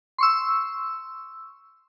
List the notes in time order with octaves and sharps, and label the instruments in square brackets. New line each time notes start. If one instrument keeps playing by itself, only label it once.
[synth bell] C6 C#6 E6